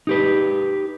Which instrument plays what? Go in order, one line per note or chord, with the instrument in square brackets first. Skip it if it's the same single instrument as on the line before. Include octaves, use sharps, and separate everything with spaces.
[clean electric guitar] D#4 G4 B4